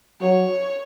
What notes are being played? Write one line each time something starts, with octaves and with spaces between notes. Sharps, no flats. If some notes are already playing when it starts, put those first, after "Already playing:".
F#3 C#5